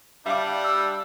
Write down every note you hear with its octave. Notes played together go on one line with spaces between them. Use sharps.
G3 D4 E5 F5 D6
E6